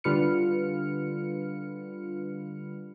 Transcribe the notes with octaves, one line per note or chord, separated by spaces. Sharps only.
D3 G3 F4 B4 F6 C#7